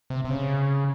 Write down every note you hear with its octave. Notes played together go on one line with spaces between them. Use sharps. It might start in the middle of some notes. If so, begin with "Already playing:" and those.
C3
C3
C#3